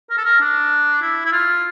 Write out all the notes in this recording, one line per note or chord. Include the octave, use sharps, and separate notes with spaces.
A#4
A4
A#4
D4
E4
E4
F4